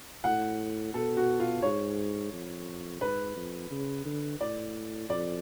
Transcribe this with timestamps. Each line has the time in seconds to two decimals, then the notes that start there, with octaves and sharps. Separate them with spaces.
0.24 A2 F#5
0.94 B2 A4
1.17 F#4
1.40 F4
1.62 G#2 C#5
2.32 F2
3.01 G#2 B4
3.36 F2
3.71 C#3
4.05 D3
4.40 A2 D5
5.09 F2 D5